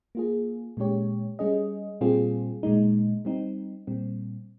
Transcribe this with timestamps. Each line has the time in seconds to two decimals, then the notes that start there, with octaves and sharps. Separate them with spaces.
0.15 A#3 F4 G#4
0.77 A#2 G#3 C#4 G4 C#5
1.39 G3 C#4 G#4 D#5
2.01 A#2 G3 C4 F4 G#4
2.63 A#2 G#3 D#4
3.25 G3 C4 D#4
3.87 A#2 G3 C4